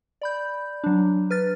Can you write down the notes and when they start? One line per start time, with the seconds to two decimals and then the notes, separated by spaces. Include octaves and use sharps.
0.22 D5 B5 G6
0.84 F#3 D4
1.30 B4 F6 A6